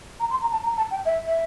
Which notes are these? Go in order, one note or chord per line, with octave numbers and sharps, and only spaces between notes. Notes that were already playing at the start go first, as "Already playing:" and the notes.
A#5
C6
A#5
A5
A#5
A5
G5
E5
E5